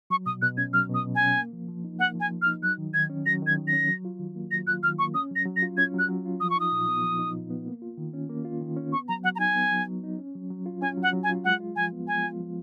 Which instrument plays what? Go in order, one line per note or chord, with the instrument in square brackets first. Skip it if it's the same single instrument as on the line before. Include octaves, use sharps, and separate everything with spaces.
[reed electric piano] F#3 [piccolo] C#6
[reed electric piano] B2 [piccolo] D#6
[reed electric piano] B2 [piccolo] F#6
[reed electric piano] C#4 [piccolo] G#6
[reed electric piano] F#3 [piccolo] F6
[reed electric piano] B2 [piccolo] D#6
[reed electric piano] B2
[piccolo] G#5
[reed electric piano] C#4
A#3
F3
F3
D#4
[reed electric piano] A#3 [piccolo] F#5
[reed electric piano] F3
[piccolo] G#5
[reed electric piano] F3
[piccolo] F6
[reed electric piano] D#4
[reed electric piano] F#3 [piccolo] F#6
[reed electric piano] D#3
[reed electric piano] D#3 [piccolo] G#6
[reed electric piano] C#4
[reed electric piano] F#3 [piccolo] A#6
[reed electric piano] D#3 [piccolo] G#6
[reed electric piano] D#3
[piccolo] A#6
[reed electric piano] C#4
F#3
F4
D#3
A#3
[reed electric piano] F#3 [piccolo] A#6
[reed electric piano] F4 [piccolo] F#6
[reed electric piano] D#3 [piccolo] F6
[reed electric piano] A#3 [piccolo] C#6
[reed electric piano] C#4 [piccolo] D#6
[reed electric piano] F#3 [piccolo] A#6
[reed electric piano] F#3
[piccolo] A#6
[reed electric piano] F4
[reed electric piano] C#4 [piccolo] G#6
[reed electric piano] F#3 [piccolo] F#6
[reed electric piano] F#3
F4
[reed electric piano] F3 [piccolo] D#6
[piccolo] C#6
[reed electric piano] D#4 [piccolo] D#6
[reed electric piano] A#2
B3
F3
D#4
A#2
B3
A#3
F4
D#3
C#4
A#3
F4
D#3
C#4
[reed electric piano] B3 [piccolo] C#6
[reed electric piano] F#3 [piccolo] A#5
[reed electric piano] F#3 [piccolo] F#5
[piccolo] A#5
[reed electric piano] D#4 [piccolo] G#5
[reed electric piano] B3
F#3
F#3
D#4
C#4
F#3
F#3
F4
[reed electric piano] C#4 [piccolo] G#5
[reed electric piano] F#3
[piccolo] F#5
[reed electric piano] F#3
[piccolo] G#5
[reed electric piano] F4
[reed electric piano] G#3 [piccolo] F#5
[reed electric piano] F4
[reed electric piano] F3 [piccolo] G#5
[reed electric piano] B3
[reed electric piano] G#3 [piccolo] G#5
[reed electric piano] F4
F3